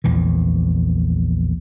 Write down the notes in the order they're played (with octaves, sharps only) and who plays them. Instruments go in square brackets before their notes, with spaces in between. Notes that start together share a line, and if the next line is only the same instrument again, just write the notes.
[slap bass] A#1 E2 E3